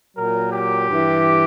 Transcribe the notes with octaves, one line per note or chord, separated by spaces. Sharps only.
A#2 F#3 A#4
G4
G2 E3